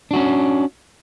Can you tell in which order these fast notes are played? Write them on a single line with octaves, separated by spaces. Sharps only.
D4 F#4 C#4